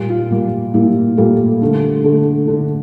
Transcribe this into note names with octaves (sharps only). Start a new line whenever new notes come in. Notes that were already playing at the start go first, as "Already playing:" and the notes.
Already playing: A#2 G3 A#3
F4
A#2 G3 A#3
A#2 G3 A#3 E4 G4
A#2 G3 A#3 F4 A4
D3 A3
D3 A3
D3 A3